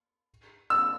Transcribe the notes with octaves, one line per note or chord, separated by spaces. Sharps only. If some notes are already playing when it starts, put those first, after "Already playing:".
E6